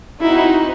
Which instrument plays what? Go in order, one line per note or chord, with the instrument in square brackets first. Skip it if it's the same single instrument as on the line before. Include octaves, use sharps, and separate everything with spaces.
[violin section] C4 D#4 F#4 [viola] E4